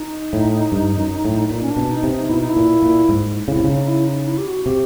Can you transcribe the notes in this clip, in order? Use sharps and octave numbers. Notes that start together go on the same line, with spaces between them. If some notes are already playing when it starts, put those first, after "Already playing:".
Already playing: D#4
A2
G2
F#2
A2
A#2 D#4
C#4
D4
B2
D#4
C3
D#4
B2 E4
D#4
E4
A#2
A#2
G#2
C#3 E4
C3
C#3 D#4
D#4
E4
D#4
E4
G4
F#4
C3 G4